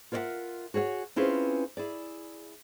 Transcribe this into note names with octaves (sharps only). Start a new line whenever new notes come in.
F4 A#4 C#5 D5 E5 F#5
F#4 G#4 C#5 F5 F#5
C4 C#4 E4 F4 G#4 B4
E4 G#4 D5